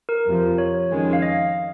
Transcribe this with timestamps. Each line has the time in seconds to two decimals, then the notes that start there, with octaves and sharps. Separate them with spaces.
0.09 A#4
0.26 F2 C3 F3
0.58 C#5
0.90 F2 D#3 G#3 C#4
1.13 F5
1.22 D#5